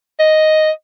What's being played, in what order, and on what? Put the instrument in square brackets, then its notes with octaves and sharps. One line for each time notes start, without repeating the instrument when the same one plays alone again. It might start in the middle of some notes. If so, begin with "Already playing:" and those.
[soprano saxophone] D#5